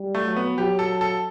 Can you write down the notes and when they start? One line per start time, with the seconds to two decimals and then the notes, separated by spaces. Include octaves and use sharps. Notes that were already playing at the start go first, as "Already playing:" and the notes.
Already playing: G3
0.15 A3
0.26 F#3
0.36 B3
0.58 F#3 G4
0.79 A4
1.01 A4